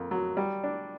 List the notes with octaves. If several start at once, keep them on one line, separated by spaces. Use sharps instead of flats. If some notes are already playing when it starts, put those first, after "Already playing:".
Already playing: F2 A#3
F#3
G3
D4